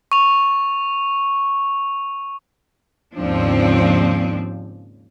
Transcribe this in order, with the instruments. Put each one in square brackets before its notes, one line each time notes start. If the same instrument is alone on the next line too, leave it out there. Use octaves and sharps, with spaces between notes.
[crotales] C#6 F7
[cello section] D#2 G#2 C#3 F3 C4 D4